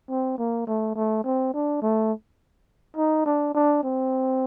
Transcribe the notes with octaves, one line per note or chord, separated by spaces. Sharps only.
C4
A#3
A3
A3
C4
D4
A3
D#4
D4
D4
C4